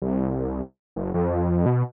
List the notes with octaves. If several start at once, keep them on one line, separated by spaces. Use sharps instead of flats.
C2
F#1
F2
B2